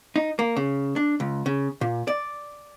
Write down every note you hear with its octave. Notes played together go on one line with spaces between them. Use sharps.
D#4
A#3
C#3
D4
C#2
C#3
A#2
D5